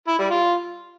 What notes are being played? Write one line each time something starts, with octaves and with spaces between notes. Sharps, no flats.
E4
G3
F4